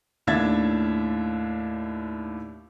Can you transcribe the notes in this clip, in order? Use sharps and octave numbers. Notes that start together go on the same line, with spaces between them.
D#2 A2 D4 E5 G#6 A6